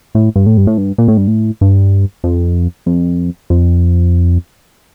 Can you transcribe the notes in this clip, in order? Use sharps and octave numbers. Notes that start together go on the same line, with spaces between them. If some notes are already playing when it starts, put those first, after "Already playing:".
A2
G2
A2
G2
A2
G2
A#2
A2
G2
A2
G2
F2
F2
F2